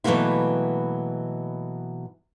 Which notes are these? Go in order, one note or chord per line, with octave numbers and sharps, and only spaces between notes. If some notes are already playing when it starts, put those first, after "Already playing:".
B2 E3 F#3 A3 A#3 E4